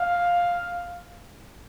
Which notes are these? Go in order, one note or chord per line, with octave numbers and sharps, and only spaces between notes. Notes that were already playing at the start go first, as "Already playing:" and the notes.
Already playing: F5